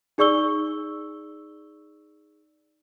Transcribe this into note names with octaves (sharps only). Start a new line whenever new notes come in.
D#4 G#4 D5 C#6 E6 G7